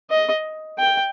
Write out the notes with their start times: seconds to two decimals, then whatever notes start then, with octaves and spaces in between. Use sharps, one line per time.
0.10 D#5
0.79 G5